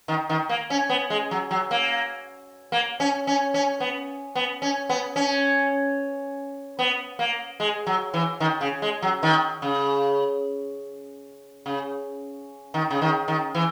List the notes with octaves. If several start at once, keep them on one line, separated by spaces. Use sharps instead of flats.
D#3
D#3
A#3
C#4
B3
G#3
F#3
F#3
A#3
A#3
C#4
C#4
C#4
B3
B3
C#4
B3
C#4
B3
A#3
G#3
F#3
E3
D#3
C#3
G#3
F#3
D#3
C#3
C#3
D#3
C#3
D#3
D#3
E3